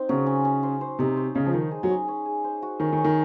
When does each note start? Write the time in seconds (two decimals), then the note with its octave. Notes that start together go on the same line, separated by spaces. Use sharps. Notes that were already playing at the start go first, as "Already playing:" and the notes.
Already playing: C4 D#4
0.09 C#3 F#3
0.26 C#4
0.45 C#4
0.63 C5
0.81 C5
0.99 C3 D#4
1.17 C5
1.35 C#3 D#4
1.46 F3
1.53 D#3 D#4
1.71 G#4
1.83 F#3
1.90 C#4
2.08 C#4
2.26 G#4
2.44 C5
2.62 F#4
2.80 D#3 C#4
2.93 D#3
2.98 C#4
3.04 D#3